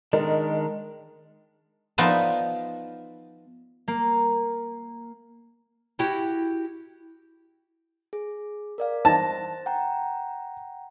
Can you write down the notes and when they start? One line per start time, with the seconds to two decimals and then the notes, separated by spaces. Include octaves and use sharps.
0.13 D#3 G#3 D4 A#4 D#5
1.98 F3 B3 D#4 B4 D5 E5
3.88 A#3
5.99 E4 F#4 G4
8.13 G#4
8.78 A#4 D5 F5
9.05 C5 A5 A#6
9.66 F#5 G5 A#5